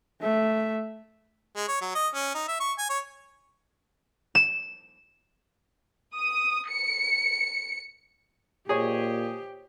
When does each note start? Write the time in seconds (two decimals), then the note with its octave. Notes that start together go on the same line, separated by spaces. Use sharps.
0.21 A3 E5
1.56 G#3
1.68 C#5
1.81 F#3
1.95 D#5
2.15 C#4
2.35 D#4
2.48 E5
2.60 C#6
2.78 G#5
2.90 C#5
4.35 E7
6.14 D#6
6.68 C#7
8.69 A#2 G4 G#4 C5 C#5 D#5